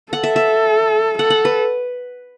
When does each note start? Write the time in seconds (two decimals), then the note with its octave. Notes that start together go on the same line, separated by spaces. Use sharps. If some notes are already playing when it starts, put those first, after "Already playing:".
0.12 A4 F#5
0.24 E5
0.36 E5
1.19 A4 F#5
1.30 F#5
1.45 B4